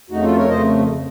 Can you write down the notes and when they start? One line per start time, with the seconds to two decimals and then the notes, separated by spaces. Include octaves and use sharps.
0.10 F2 C#3 A3 D#4 F#4
0.23 F4 A4
0.36 A#4 C#5
0.48 F2 C#3 A3 C5 D#5